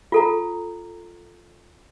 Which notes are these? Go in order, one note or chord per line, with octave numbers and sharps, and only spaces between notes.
F4 A4 A#5